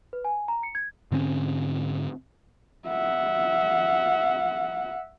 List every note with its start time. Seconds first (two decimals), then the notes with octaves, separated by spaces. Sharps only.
0.13 B4
0.24 G#5
0.48 A#5
0.63 C#7
0.75 G#6
1.12 G#2 D3 C4 C#4
2.88 E5 F#5